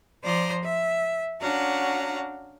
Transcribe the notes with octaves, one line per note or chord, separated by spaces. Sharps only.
F3 C5 D5 A#5 C6 D#6
E5
C#4 D4 F#4 F5 F#5 A#5